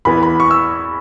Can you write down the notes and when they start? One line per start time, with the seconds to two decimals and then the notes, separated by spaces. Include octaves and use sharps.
0.05 E2 E3 B3 E4 B5
0.23 B5
0.40 C#6
0.51 E6